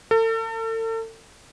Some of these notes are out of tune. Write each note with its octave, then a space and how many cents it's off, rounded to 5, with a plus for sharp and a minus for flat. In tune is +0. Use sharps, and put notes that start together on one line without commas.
A4 +40